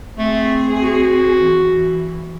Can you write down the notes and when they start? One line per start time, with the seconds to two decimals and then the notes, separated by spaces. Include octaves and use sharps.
0.18 A3 C4 G#4
0.81 F#4
1.39 E3